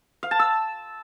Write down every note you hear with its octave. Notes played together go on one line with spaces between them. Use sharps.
F5
A5
E6